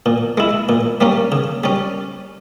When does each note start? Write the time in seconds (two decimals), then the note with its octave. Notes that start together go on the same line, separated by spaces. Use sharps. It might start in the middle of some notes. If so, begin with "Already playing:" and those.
0.06 A#2
0.38 G#3 E4
0.69 A#2
1.01 G3 A#3 C#4
1.32 C#3
1.64 G3 C#4